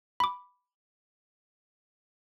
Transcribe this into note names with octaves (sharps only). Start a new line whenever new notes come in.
B5 D6